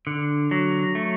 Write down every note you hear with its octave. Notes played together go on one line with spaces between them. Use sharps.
D3
F#3
A3